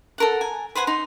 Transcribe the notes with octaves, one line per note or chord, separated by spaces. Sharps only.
A4 A#4 F#5
G#5
B4 C5 F#5 G#5
D#4 C6